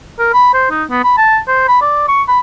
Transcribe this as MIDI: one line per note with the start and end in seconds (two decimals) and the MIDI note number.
0.19 0.33 70
0.33 0.51 83
0.54 0.67 72
0.71 0.84 63
0.90 1.03 59
1.04 1.14 83
1.18 1.39 81
1.48 1.66 72
1.68 1.79 83
1.81 2.05 74
2.08 2.22 85
2.28 2.40 83